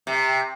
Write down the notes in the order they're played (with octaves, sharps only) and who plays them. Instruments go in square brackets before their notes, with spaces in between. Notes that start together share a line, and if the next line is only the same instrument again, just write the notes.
[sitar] C3